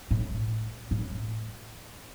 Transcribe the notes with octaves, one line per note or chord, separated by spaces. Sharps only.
A2
A2